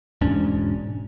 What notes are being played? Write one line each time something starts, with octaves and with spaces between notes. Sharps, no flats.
E1 G#2 C#4 D4